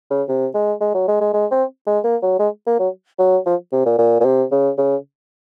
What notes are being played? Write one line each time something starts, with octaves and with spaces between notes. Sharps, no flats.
C#3
C3
G#3
G#3
F#3
G#3
G#3
G#3
C4
G#3
A#3
F#3
G#3
A#3
F#3
F#3
F3
C3
A#2
A#2
A#2
C3
C#3
C#3